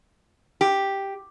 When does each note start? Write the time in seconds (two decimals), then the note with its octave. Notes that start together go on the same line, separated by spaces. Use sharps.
0.61 G4